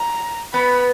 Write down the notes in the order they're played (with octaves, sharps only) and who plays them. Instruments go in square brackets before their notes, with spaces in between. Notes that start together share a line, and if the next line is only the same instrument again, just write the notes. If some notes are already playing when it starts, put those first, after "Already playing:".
Already playing: [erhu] A#5
[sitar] B3 [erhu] B5